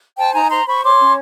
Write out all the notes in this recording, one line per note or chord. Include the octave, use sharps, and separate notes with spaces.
C5 G5 A5
D#4 G#5 A#5
C5 A#5 C6
C5 B5 C#6
C#5 C6 D6
C#4